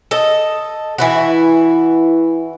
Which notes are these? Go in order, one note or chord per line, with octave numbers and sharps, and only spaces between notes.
A4 D#5
E3 E4 F#4